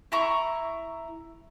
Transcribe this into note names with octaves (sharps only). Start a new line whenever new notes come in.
E4 A#5 C#6